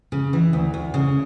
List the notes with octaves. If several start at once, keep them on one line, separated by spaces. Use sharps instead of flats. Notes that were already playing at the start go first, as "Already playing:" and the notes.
C#3
E3
D2
D2
C#3